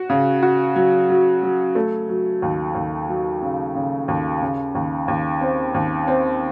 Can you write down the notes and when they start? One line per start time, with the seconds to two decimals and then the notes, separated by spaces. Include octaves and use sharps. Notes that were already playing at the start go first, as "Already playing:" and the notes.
Already playing: F#4
0.10 C#3
0.43 F#4
0.76 F#3
1.10 F#3
1.43 F#3
1.75 A3
2.08 F#3
2.42 D#2
2.75 D#2
3.09 F#3
3.42 C#3
3.75 C#3
4.08 D#2
4.42 C#3
4.75 D#2
5.08 D#2
5.41 C4
5.74 D#2
6.07 C4